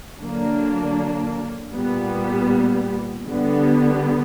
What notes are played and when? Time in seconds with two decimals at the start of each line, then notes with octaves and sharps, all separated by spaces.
0.21 D3 F#3 A#3 D4
1.74 A#2 G3 B3
3.27 D3 G3 B3